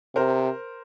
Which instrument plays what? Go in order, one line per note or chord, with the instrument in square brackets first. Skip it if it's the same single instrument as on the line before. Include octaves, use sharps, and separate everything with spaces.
[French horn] C3 [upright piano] A#4 C5